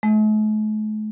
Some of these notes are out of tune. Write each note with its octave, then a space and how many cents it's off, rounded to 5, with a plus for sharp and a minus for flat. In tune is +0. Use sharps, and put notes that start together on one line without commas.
A3 -45